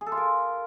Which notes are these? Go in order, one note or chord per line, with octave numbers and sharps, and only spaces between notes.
G#4
A4
F4
A#4